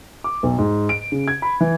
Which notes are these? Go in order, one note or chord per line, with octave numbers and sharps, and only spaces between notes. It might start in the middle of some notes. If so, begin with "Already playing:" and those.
D6
B1
G#2
D7
C#3
G#6
B5
E3